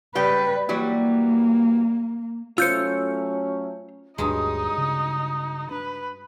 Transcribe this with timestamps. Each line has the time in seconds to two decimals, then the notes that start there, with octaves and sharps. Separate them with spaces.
0.15 C#3 G3 B4 G5
0.69 E3 F#3 G3 A#3
2.58 F#3 A3 C#4 F4 C5 E6 G6 C#7
4.18 G1 D2 G2 F#3 G#3 D#4 D#6
4.78 C#3
5.71 D4 B4